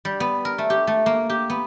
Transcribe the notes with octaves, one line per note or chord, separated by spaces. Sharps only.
G3
B3
A#4
A3
G4
A3
A#3
G4
B3